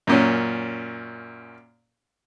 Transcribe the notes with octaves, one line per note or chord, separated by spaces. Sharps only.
F#2 A#2 C#4